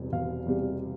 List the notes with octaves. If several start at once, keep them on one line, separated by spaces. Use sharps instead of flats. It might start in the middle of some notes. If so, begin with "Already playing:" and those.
Already playing: E1 E2 C3 G3
E1 F5
E2 C3 G3